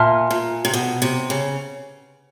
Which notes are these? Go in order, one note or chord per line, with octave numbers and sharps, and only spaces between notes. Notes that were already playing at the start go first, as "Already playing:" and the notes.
Already playing: A#2 E5 A5 C6 F6
A#2
C3
B2
C3
C#3